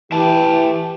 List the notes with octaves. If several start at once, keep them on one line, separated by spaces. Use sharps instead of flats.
E3 G4 E5 G5 A5